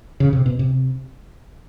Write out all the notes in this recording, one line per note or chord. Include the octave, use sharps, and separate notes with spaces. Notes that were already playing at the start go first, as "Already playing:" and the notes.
C#3
C3
B2
C3